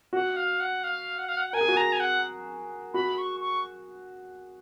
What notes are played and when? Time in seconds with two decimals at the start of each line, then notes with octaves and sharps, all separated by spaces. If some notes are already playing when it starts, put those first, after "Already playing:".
0.13 F#4 F#5
0.36 F5
0.60 F#5
0.84 F5
1.18 F#5
1.28 F5
1.37 F#5
1.49 F#5
1.53 A#4 G#5
1.61 G#4
1.68 F#4
1.76 G#4 A#5
1.92 G#5
2.00 F#5
2.94 F#4 B5
3.18 C#6
3.40 C#6